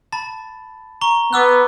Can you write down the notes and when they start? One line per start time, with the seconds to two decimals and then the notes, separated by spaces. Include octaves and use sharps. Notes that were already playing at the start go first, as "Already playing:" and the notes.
0.12 A5 B5 A6
1.01 A#5 C#6 G7
1.33 B3 D6 E6 F#6